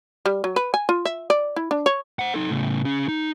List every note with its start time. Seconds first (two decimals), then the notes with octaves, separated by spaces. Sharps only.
0.26 G3
0.44 F#3
0.56 B4
0.74 G#5
0.89 F4
1.05 E5
1.30 D5
1.56 E4
1.71 D4
1.86 C#5
2.19 C5 F#5
2.34 D#4 A4
2.50 A2 C#3
2.85 C#4 G#4
3.08 D#4